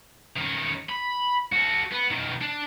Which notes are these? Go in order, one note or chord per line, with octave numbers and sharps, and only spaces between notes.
D#3 C#4
B5
F#4 A4
B3
B2 D#3
D4